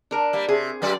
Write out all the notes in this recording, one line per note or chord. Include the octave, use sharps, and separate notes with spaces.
D4 A#4
G3 A#3
C3 G#4
F#2 F#3 D5